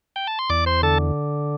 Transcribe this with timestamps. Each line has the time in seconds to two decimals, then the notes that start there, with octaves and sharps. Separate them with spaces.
0.16 G5
0.27 A5
0.39 C6
0.50 E2 D5 D6
0.66 C5 C6
0.83 D3 A4 A5